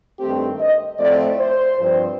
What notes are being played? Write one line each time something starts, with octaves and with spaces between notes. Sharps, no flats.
G2 D#3 A3 C4 G4
D#5
A2 F3 A3 C4 D5
C5
G2 F3 C4